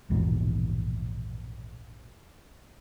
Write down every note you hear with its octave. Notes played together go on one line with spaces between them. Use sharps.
A#1 E2 G#2 B2